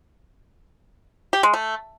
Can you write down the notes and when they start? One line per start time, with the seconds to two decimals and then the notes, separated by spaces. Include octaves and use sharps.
1.33 G4
1.43 G#3
1.53 A3